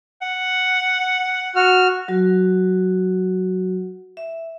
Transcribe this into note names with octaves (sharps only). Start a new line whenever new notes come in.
F#5
F#4 F6
F#3 F#4
E5